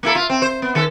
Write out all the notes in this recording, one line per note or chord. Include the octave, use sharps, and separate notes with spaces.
A#3 E4 A4
F4
C4
C5
B3
D#3 A4